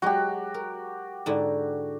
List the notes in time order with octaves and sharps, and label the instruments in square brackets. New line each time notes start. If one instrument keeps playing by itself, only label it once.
[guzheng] F#3 G#3 [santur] F#4 G4
[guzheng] A#4
G#2 D3 E4